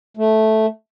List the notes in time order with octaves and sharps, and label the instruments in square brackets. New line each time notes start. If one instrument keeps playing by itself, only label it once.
[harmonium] A3